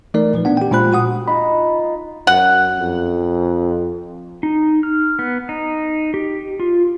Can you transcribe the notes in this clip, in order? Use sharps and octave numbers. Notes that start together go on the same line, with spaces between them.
E3 A3 D#4 A#4 D5
A#2 F3 B4
B3 D4 F#5
G4 G5
A#2 G#3 F4 C5 B5 F#6
F#4 F#5 D#6
D#4 F4 B5
F#2 F#5
F2
D#4
F6
B3
D#4
G4
F4